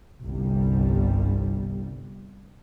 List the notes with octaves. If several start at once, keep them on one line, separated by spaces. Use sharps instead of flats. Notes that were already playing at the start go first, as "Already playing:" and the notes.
G1 C2 G3